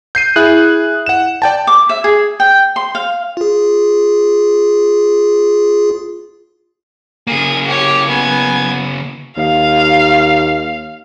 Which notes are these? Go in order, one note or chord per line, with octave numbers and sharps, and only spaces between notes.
G6 C7 D#7
E4 G#4 F#6
F#5 E7
D5 G5 A5
D6
E5
G#4
G5
C6
F5
F4 G#4
C#3 A#3 G#4
G4 C#5
B3 G#5
D#2 F5